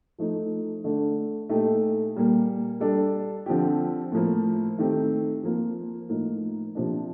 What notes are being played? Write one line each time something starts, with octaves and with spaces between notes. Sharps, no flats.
F3 A3 D#4
D3 A3 D4
A#2 A3 D#4 G4
A#2 G3 A#3
G3 D4 A4
D3 F3 C4 G4
A2 F3 A#3
D#3 A3 C4 G4
F3 A#3 F4
A2 F3 A#3 D#4
C3 F3 A#3 D4